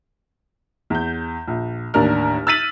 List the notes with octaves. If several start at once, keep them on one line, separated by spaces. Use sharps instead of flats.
E2 G6
A#1
A1 D#2 D4 A#4 F6
E6 F6 A6 B6 D#7 F#7